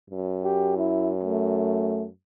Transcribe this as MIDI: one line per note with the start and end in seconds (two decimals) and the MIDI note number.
0.10 2.09 42
0.44 0.74 67
0.77 1.12 64
1.24 2.05 57